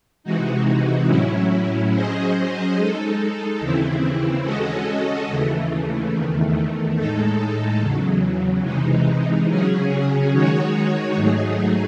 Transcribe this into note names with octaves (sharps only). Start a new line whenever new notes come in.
C3 E3 G#3 D#4 F#4
A2 F#3 C#4 E4
F#3 C#4 G#4 C5 D#5
G#3 D#4 A4
D#2 C#3 E3 C4 E4
G#3 C#4 F#4 A4 D#5
D#2 C#3 E3 A3
E2 D#3 A3
A2 G#3 D#4 A4
E2 C#3 F#3
C3 E3 G#3 D#4
C#3 F#3 C#4 G#4
D#3 G#3 D#4 F#4 C#5
G#2 F#3 A3 D#4 G#4